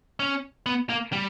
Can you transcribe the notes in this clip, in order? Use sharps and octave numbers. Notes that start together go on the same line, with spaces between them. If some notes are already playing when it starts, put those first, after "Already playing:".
C#4
B3
A#3
G3